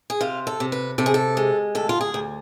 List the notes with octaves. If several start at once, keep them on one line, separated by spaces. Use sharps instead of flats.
G#4
C3 F4
A4
C3
B4
C3 A4
G#4
A4
G#3
D2 A4
F4
G#4
D2